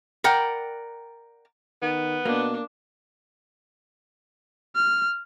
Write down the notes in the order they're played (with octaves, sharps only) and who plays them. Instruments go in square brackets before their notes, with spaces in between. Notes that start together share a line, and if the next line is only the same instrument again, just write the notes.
[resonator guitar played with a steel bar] A#4 D5 F#5 G5
[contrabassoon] D#3 [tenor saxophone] B3
[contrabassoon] B2 [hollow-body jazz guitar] A#3 [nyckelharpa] D4
[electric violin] F6